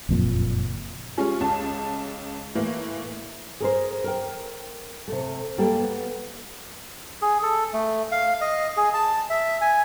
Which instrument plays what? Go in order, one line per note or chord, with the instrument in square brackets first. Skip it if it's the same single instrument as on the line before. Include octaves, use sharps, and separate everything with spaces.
[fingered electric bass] F#1 F2 A#2
[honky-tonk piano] G3 G#3 C#4 F4 G#4
C#2 A5
A2 E3 A#3
[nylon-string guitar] G#4 A#4 C5
A#4 G5
C3 A3
G3 A#3 G4 A4 G5
B3
[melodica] G#4
A4
A3
F5
D#5
G#4
A5
E5
G#5